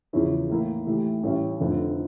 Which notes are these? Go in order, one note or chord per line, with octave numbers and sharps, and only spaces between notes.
E2 C#3 F3 C#4 E4
A2 E3 A#3 E4
A2 E3 A3 E4 G4
A1 A2 G3 C#4
F1 F2 D3